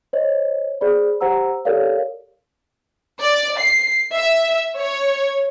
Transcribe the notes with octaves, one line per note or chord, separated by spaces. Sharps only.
C5 C#5 D#5
G#4 C5 D5 B5
G4 C5 F#5 A#5 E6
G4 A4 A#4 C#5 D5 F5
D5
C7
E5
C#5